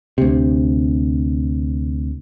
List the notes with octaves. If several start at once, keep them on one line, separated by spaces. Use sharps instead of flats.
D2 C3